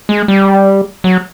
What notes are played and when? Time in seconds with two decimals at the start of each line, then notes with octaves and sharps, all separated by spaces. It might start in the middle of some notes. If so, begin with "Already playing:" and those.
0.09 G#3
0.28 G3
1.04 F#3